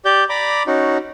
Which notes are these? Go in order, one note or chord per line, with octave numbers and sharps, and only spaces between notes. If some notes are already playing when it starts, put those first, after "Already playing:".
G4 D5 G6
D5 A#5 B5 D6
C#4 D#4 F#4